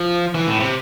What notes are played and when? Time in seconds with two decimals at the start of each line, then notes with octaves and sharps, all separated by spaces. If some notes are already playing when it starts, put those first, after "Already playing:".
Already playing: F3
0.34 E3
0.47 A2
0.60 C3